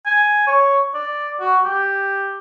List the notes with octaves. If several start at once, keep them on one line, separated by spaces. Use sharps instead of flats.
G#5
C#5
D5
F#4
G4